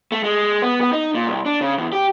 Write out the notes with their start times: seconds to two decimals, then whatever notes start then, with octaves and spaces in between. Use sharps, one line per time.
0.12 A3
0.24 G#3
0.62 B3
0.81 B3
0.93 D#4
1.15 A#2
1.27 C2
1.46 D4
1.61 C#3
1.78 E2
1.93 G4